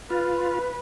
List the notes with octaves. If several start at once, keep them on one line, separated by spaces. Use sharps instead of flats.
F4 B4